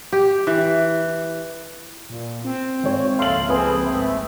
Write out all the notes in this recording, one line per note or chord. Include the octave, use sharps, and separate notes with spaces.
G4
E3
A#2
C4
G#1 C#5
C#2 F3 A#3 A4 E5 F5 C6 F#7
C4 G#4 A4 B4 G#5 D#6
G#1 A3 E5